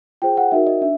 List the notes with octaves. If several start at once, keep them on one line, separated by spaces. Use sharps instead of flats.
F4 G#4 C5 G5
F#5
D#4 F#4 A#4 E5
D#5
D4 E5